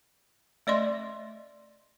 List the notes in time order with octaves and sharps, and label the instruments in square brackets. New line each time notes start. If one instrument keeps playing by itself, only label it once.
[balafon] A3 D5 D#5 C6